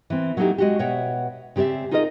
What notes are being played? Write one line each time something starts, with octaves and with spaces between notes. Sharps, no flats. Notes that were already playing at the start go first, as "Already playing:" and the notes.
E3 C4
F#3 A3 A#3 D#4 E4 G4
G#3 F#4 G4
B2 C#5 E5 F#5 G5
C#3 C4 G4 D5 E5
D#4 F4 G#4 A#4 D5 D#5